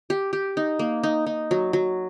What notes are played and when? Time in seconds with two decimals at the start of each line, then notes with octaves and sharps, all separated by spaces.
0.10 G4
0.33 G4
0.57 D#4
0.79 A#3
1.03 D#4
1.26 D#4
1.51 F#3
1.73 F#3